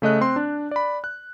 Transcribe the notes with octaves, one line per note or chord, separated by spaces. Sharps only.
C#3 A3 D#5 F#6
C4 C6
D4
D5 B5
F#6